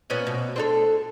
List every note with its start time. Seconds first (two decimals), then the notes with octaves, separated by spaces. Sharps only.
0.10 A#2 B3 C#4
0.27 B2
0.56 C4 D4 A4